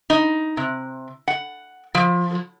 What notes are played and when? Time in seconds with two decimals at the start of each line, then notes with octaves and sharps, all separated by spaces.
0.10 D#4
0.57 C3
1.28 F#5
1.95 F3